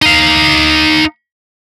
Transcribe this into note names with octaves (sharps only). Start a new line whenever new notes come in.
D#4 F5